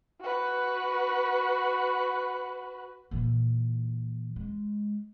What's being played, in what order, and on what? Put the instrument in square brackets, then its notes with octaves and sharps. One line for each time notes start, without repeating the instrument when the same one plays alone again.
[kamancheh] F#4 B4
[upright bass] A#2 E3
G#3